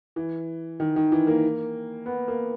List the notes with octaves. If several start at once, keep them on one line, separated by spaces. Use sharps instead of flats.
E3
D#3
D#3
E3
A#3
B3
A#3